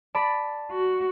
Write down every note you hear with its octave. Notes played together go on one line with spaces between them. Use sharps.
D5 A5 B5
F#4